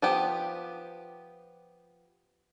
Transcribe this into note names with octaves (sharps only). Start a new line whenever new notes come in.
F3 B3 G4